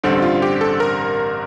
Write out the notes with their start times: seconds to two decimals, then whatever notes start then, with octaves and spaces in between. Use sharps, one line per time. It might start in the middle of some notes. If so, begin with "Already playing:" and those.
0.04 A1 G2 D3 G3 C4 A4
0.22 F4
0.42 G4
0.61 A4
0.80 A#4